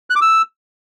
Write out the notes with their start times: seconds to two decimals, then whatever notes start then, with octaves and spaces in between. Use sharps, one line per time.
0.10 F#6
0.16 D6
0.21 E6